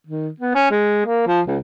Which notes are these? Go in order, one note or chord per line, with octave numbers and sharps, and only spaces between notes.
D#3
B3
C#4
G#3
A#3
F3
C#2